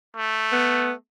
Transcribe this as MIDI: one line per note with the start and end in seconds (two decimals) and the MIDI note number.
0.17 0.95 57
0.52 0.92 59